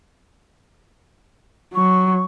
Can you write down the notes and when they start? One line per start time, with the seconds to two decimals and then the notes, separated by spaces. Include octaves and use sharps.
1.74 F#3 C#6